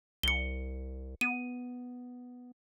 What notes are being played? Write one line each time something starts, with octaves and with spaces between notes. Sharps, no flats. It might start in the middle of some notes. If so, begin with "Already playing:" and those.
C2 C#7 G7
B3 D#7